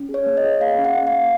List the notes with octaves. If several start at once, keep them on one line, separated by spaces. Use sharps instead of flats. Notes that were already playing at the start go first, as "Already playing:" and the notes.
Already playing: C#4
G#4
C#5
A#3
D#5
G#4
A#3 F5
C#4
F#5
A#3
F5
A#3